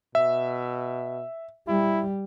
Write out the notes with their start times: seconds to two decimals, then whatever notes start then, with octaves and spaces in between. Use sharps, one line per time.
0.15 B2 E5
1.68 G3 E4